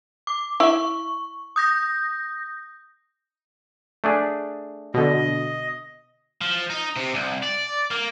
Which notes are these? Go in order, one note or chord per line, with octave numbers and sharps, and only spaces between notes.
D6
E4 E5 C#6
D#6 G6 A#6
A3 D4 G#4
B2 D3 D#5
F3
D#4
C3
C2
D5
A#3